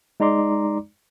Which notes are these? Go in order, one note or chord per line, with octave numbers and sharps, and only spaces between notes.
G#3 D#4 D5 A#5 C6 D6